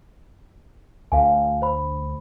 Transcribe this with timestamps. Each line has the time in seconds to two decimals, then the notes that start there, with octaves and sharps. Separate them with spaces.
1.12 D2 F5 G#5
1.62 C5 B5